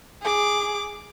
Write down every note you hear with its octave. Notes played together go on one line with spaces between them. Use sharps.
G#4 D6